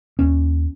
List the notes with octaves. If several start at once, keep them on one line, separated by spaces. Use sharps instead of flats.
D#2 C#4